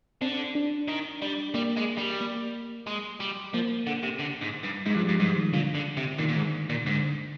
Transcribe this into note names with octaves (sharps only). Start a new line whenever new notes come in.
D3 C4
D4
D#3
G3
G3 A#3
G#3
G3
A#3
G#3
G3
F3 A#3
D3
C3
D3
G#2
G2
G#2 G#3
G2 F3
G3
G2
G#2 G3
D#3
A#2 D3
D3
C3
A#2 D#3
A#2
G#2
A#2
G#2 D3